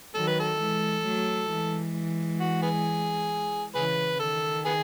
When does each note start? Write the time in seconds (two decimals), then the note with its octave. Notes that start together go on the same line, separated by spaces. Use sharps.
0.15 D#3 F#3 A4
0.28 B4
0.40 A4
0.60 E3 G#3
1.05 F#3 A3
1.50 E3 G#3
2.40 F#4
2.62 B3 G#4
3.75 C#3 E3 G#4 B4
4.20 D#3 A4
4.65 B3 G#4